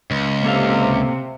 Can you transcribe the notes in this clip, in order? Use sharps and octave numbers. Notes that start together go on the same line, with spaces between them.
C#2
C3 A#3 A4 F5